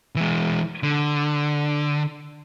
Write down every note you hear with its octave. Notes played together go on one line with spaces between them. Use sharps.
E3 G#3
D3